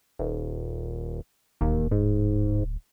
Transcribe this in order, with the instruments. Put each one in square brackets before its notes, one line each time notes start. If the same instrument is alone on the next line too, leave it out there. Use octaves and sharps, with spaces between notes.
[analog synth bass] D#1
[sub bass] D1 [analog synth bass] D#2
[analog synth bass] G#2